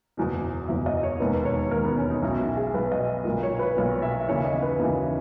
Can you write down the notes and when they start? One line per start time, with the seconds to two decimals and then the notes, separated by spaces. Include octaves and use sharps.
0.17 F#1 E2 B2
0.68 F#1 E2 B2 E5
0.86 D#5
1.03 C#5
1.20 E1 D#2 D#3 B4
1.45 C#5
1.71 E1 D#2 D#3 A#4
1.85 B3
1.98 C#4
2.10 D#4
2.22 B1 B2 E4
2.39 F#4
2.57 G#4
2.74 B1 B2 B4
2.92 D#5
3.25 B1 A#2 A#4
3.43 C#5
3.59 B4
3.77 B1 A#2 C#5
4.02 E5
4.28 D#2 C#3 E3 C#5
4.45 D#5
4.62 B4
4.79 D#2 C#3 E3 F#4